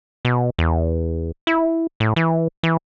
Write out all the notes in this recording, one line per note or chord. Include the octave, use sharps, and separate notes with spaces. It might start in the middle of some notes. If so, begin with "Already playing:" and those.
B2
E2
E4
A2
E3
E3